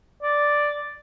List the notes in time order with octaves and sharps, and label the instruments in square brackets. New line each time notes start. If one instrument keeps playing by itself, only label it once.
[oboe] D5